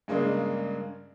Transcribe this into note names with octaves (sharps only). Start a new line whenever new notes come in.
G2 C#3 G#3 A#3 D4